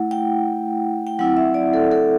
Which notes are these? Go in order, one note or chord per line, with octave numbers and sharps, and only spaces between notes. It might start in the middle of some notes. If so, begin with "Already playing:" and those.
Already playing: A3 E4 F#5
G5
G5
F#3 C4 E4 F#5
E5
D5
A4
A4